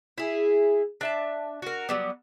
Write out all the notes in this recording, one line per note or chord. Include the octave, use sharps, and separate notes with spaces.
E4 G#4
D4 E5 A5
F#4 A#4
F#3 G3 B3